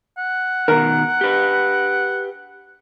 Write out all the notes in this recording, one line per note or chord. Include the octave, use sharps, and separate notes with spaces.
F#5
B2 D#3 A#4
G4 B4